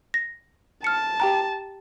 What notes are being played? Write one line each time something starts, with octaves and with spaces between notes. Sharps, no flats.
A#6
A5 F6 C#7
G4 G5 A#5